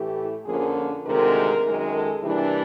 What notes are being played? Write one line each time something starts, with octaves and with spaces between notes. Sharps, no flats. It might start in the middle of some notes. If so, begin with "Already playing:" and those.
Already playing: A2 E3 A3 G4
F2 D3 F3 A#3 C#4 G#4
D2 C3 D#3 G#3 C4 A#4
F#2 D#3 G#3
A4
C3 E3 G3 A#3 D4 E4